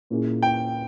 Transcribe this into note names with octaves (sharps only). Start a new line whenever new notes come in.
A#2 A#3 C#4 E4 G#4
G5